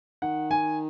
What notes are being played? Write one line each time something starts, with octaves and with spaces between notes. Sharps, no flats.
D#3 F#5
G#5